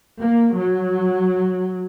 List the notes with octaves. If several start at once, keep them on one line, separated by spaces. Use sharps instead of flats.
A#3
F#3